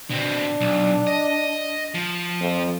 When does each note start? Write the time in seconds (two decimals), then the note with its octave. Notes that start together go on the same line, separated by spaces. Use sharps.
0.10 B2 C4 D4
0.61 B1
1.07 D#5
1.94 F3
2.41 F2